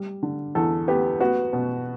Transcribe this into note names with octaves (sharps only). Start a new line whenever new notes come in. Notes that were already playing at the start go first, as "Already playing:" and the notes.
Already playing: G3
D3
E2 A4
B3 G4
B3 F#4
B2